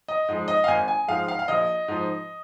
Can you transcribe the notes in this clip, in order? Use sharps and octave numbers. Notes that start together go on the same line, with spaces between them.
D#5
G#2 F3 G#3
D#5
F5
G#1 G#5
G#5
G#2 F3 G#3 F5
F5
F5
A#1 D#5
G#2 F3